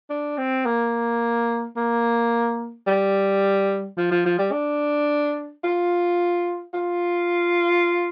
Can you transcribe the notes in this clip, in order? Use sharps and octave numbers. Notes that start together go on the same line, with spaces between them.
D4
C4
A#3
A#3
G3
F3
F3
F3
G3
D4
F4
F4